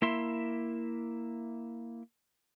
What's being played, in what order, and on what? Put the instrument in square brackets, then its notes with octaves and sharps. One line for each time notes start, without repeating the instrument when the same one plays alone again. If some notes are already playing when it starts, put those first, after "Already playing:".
[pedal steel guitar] A#3 E4 E5 C6